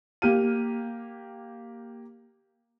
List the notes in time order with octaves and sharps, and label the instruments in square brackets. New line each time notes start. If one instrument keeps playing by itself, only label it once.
[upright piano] A#3 G4 F6 D#7